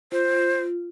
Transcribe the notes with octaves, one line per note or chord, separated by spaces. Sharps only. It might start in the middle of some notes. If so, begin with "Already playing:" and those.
F4 C5